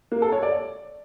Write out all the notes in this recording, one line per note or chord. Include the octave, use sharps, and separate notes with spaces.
A#3
A4
C#5
D5